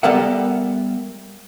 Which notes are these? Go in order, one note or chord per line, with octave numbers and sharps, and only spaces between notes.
G3 B3 A4 A#4 E5 F#5